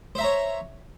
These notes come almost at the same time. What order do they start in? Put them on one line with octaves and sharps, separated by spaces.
C5 E5 A#5 C#5